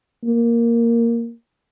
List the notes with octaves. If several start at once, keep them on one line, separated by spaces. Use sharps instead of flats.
A#3